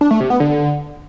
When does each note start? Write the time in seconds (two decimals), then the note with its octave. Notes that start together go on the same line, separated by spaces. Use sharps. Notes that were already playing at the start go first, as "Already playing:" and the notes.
0.01 D4
0.11 A3
0.20 C3
0.30 B3
0.40 D3